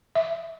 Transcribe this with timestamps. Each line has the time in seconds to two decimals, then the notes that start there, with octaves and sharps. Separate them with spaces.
0.15 E5